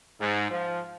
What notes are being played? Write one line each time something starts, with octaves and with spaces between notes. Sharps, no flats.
G#2
F3